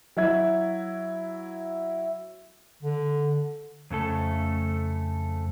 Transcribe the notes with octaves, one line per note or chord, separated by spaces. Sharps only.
F#3 E4 G#6
D3
F2 C#3 A3 A4